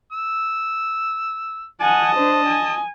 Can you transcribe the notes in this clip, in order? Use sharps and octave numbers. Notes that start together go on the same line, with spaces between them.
E6
D#5 F#5 G#5 A5
D4 C5
G#5